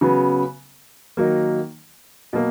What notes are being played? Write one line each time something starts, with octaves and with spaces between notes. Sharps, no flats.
C#3 F#3 B3
D#3 F#3 A#3
B2 F#3 A#3